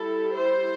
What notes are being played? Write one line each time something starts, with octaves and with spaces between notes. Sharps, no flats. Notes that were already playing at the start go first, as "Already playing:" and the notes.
Already playing: G3 E4 A4
C5